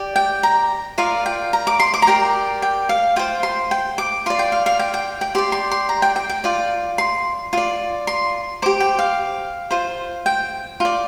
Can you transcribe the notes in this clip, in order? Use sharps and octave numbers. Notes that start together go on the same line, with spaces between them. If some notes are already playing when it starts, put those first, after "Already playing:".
Already playing: G4 D5
G5
A#5
F4 A#4 D5 F5
G5
A#5
D6
C6
D6
A#5
G4 A#4 D5 G5
G5
F5
F4 C5 G5
C6
G5
D6
F4 D5 C6
G5
F5
F5
G5
G5
G5
G4 D5 C6
C6
C6
A#5
G5
G5
G5
F4 D5
C6
F4 D5
C6
G4 C5 D6
G5
F5
F4 C5
G5
F4 D5